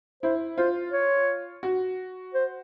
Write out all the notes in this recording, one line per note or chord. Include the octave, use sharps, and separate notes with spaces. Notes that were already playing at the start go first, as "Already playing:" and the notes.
E4 C5
F4 C5
C#5
F#4
C5